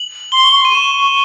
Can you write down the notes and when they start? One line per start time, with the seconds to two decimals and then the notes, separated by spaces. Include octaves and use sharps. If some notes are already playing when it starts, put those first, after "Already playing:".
Already playing: F#7
0.32 C6 G7
0.44 C#6
0.56 C6
0.65 D#7
0.75 C#6 E7